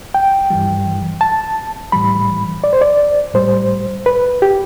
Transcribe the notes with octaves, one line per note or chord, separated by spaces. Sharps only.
G5
G2 E3 G3
A5
A2 E3 G3 B5
D5
C5
D5
A2 G3 C5
B4
G4